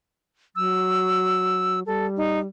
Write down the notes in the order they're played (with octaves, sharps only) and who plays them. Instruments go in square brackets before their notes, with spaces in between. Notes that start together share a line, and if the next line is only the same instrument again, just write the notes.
[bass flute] F#3 [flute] E6
[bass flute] G3 [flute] A4
[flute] D#4